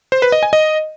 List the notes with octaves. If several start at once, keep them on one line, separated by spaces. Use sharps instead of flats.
C5
B4
D#5
G#5
D#5